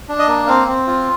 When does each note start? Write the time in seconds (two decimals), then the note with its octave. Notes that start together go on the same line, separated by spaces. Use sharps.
0.09 D4
0.19 D#5
0.28 A#3
0.47 C4 F5
0.68 C4
0.87 F4